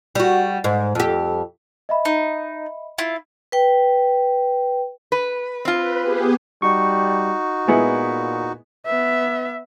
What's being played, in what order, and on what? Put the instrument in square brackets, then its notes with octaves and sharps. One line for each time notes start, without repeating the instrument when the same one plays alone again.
[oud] G3 F#4
G#2
F2 G4
[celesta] D#5 E5 B5
[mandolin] D#4
E4 F4
[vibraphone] B4 G5
[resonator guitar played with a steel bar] B4
[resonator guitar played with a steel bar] C4 F4 [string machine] B4
[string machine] B3 G4 G#4
[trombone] G3 [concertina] D#4 F#4 [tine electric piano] C#6
[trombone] A#2 [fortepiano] G#3 B3 E4
[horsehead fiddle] B3 E5